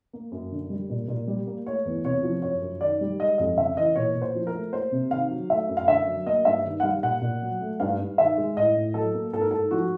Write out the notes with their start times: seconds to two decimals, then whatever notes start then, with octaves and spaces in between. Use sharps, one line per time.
0.13 A#3
0.32 F#2
0.52 D3
0.70 G3
0.90 A#2
1.08 A#2
1.27 G3
1.47 A#3
1.66 A3 C#5
1.85 E2
2.04 C3 C#5
2.23 F3
2.42 F#2 C#5
2.61 F#2
2.81 D#3 D5
3.01 G3
3.20 G#3 D#5
3.38 F2 D#5
3.57 C#3 E5
3.76 E3 D#5
3.96 A#2 C#5
4.15 A#2
4.22 C5
4.35 F3
4.47 A#4
4.53 A3
4.73 A#3 C5
4.92 C3
5.11 D#3 F5
5.30 F#3
5.50 A3 E5
5.69 F#2
5.77 F5
5.88 D3 E5
6.07 F#3
6.26 A#3 D#5
6.45 G2 E5
6.64 D#3
6.80 F#5
6.83 G3 F5
7.03 A#2 F#5
7.22 A#2
7.42 F#3
7.61 A3
7.80 G2 F5
7.99 G2
8.18 D#3 E5
8.37 G#3
8.57 A2 D#5
8.75 A2
8.94 F#3 A4
9.14 A#3
9.33 G#2 A4
9.41 A#4
9.51 G#2 A4
9.71 F3 F#4